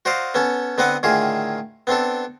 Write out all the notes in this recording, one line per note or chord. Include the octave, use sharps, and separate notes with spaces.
F#4 C5 D5 D#5 F5
B3 C#4 A4
D3 B3 C4 B4 D#5 F#5
A2 D3 D#3 F4 G#4
B3 C4 D4 A4